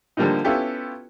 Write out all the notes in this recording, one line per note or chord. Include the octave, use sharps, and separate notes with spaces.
D3 F3 G3 A#3 D4 D#4
B3 C#4 E4 F4 G4 A4